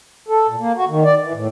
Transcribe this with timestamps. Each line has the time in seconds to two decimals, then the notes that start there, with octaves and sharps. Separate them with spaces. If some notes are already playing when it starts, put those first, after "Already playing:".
0.28 A4
0.48 A#2
0.60 A#3
0.76 F#4
0.89 D#3
1.04 D5
1.22 E3
1.34 A2